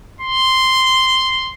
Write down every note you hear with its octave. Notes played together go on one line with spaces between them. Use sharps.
C6